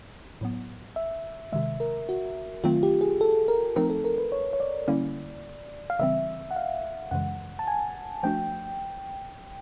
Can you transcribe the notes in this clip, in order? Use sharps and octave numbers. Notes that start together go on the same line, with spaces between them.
A2 F#3 B3
E5
C3 D#3 G#3 E5
A#4
F#4
D#3 F#3 A3 C4 F4
G4
G#4
A4
A#4
F3 A3 C4 D#4 A#4
A4
A#4
B4
C#5
C#5
D5
D3 G3 A#3 C#4 E4
F5
C#3 E3 G3 C4 E5
F#5
F5
F#2 C#3 E3 G#3 F#5
A5
G#5
F3 A3 D4 F#4 G5